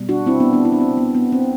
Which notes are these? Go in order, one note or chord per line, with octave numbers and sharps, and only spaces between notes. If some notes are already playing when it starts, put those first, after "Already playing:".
Already playing: B2 G3
D4 F#4
C4 E4
B3 D4
B3 D4
E4
D4
C4
B3
B3
C4